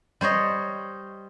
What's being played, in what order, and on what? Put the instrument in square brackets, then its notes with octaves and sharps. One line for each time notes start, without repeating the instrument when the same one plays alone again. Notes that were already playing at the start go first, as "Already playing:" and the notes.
[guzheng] G3 C5 C#5 D#5